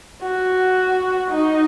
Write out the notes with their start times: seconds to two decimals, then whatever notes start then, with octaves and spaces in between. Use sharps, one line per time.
0.23 F#4
1.31 D#4